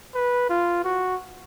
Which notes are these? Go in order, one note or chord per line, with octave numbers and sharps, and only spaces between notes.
B4
F4
F#4